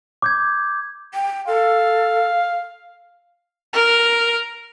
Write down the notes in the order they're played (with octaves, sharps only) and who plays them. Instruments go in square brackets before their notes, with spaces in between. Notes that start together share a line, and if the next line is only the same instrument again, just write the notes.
[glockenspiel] D6 G6 G#6
[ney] G5
[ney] A4 [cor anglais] F5
[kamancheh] A#4